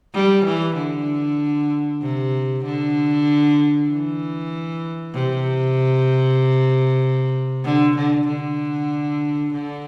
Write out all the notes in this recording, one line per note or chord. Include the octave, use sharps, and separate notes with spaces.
G3
E3
D3
C3
D3
E3
C3
D3
D3
D3
D3